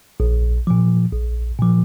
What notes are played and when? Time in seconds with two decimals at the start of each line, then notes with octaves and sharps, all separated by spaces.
0.20 A#1
0.67 A#2 F3
1.13 A#1
1.59 A#2 F3